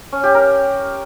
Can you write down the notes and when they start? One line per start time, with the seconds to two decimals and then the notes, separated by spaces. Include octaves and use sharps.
0.12 C#4
0.23 G4
0.34 A#4